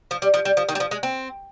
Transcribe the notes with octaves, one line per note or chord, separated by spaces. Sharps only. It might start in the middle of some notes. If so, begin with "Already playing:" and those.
F3
G3
F3
G3
F3
D#3
G3
F3
G#3
C4